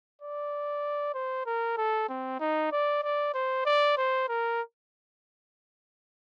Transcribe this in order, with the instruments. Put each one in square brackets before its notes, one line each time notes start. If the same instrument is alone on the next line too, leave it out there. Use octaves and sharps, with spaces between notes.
[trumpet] D5
C5
A#4
A4
C4
D#4
D5
D5
C5
D5
C5
A#4